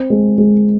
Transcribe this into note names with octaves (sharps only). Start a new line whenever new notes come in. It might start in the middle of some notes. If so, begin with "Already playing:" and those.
Already playing: C4
G#3
G#3